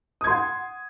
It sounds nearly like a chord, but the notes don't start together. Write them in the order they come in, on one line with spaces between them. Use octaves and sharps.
D#6 G#6 C6 F#5